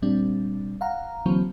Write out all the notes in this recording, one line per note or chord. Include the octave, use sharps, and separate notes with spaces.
A#2 G3 C4 D4
F5 F#5 A#5
D3 E3 F#3 A#3 C4